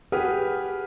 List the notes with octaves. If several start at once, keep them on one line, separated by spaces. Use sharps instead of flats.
G4 G#4 B4 F#5 F6